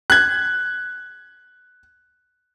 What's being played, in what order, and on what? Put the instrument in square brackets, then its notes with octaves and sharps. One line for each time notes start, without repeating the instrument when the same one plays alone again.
[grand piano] F#6 G#6